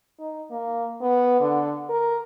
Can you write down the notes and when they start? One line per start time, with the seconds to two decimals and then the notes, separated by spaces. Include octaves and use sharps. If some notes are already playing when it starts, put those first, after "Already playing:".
0.19 D#4
0.51 A#3
1.02 B3
1.40 D3
1.89 A#4